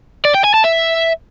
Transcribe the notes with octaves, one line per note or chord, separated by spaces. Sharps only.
D5
G5
G#5
A5
E5